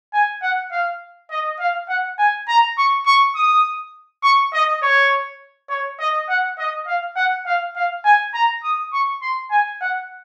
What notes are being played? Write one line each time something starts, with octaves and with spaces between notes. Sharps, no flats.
G#5
F#5
F5
D#5
F5
F#5
G#5
A#5
C#6
C#6
D#6
C#6
D#5
C#5
C#5
D#5
F#5
D#5
F5
F#5
F5
F5
G#5
A#5
D#6
C#6
C6
G#5
F#5